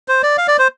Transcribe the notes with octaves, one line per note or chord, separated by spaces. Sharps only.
C5
D5
F5
D5
C5